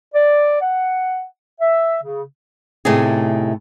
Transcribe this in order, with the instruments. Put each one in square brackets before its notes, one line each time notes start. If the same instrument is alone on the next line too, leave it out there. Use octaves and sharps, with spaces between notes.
[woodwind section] D5
F#5
E5
C#3
[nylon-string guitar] A2 C3 A3 B3 D#4 G#4